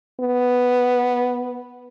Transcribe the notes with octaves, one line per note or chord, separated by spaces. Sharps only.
B3